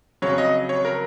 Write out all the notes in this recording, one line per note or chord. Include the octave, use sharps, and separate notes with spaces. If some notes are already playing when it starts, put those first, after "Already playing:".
F2 C#3 F#3 C#5
D#5
C#5
A#4